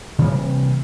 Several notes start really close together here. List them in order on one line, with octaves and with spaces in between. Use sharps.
C3 E3 A#3 G3